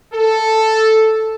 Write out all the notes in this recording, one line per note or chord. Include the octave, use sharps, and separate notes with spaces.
A4